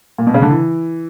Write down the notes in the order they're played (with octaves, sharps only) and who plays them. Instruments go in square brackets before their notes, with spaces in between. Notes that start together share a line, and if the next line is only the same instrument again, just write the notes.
[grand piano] A#2
B2
C#3
D3
E3